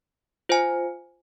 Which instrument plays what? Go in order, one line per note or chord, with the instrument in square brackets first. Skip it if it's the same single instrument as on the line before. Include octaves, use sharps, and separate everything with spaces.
[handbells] F4 C5 F5 G#5